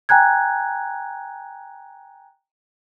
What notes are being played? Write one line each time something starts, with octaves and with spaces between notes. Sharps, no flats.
G5 G#5 A#5 F#6 G#6